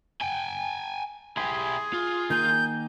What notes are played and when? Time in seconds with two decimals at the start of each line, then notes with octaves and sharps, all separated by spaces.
0.21 G5 G#5
1.37 E4 G4 G#4 G#5 C6
1.94 F4
2.30 D#3 A#3 G#5 G6